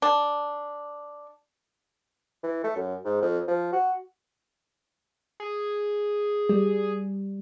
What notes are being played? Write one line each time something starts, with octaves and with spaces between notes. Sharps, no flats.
D4
E3
A3
F#2
G#2
F2
F3
F#4
G#4
G3